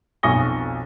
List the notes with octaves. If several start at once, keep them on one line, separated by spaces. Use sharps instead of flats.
B1 F2 G#5 C#6 A#6 G7